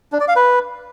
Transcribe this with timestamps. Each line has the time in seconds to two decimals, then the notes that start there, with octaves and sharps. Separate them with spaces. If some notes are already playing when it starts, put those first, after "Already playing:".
0.12 D4
0.20 D5
0.28 F5
0.36 B4